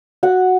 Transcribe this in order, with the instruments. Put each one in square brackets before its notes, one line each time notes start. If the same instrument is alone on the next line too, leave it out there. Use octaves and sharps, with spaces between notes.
[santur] F#4 F#5